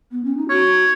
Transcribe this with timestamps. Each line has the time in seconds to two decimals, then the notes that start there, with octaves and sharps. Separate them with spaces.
0.12 B3
0.24 C#4
0.37 D#4
0.50 F#4 C#5